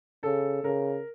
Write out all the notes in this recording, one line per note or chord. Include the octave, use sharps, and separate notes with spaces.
C#3 A4
C#3 A#4